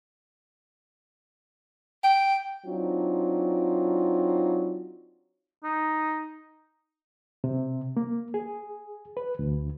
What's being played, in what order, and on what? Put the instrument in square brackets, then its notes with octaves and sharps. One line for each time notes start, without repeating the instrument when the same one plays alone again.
[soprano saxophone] G5
[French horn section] F#3 C4 D4 D#4 F4
[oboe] D#4
[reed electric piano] C3
A#3
G#4
B4
D2